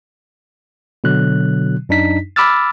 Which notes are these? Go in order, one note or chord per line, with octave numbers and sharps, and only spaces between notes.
B2 D3 F#3 F#6
F#2 D4 D#4 B6
B5 D6 E6 F6 A6